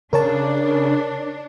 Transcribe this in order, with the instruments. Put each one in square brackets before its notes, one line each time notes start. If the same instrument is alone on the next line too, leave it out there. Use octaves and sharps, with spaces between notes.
[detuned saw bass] C#3 [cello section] D4 [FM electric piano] A#4 C#5 A5